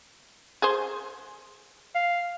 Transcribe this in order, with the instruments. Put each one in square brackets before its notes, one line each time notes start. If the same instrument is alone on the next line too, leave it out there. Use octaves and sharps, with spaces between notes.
[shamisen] G#4 C5
[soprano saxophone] F5